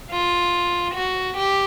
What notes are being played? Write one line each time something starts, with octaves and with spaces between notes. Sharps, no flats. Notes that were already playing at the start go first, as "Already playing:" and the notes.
F4
F#4
G4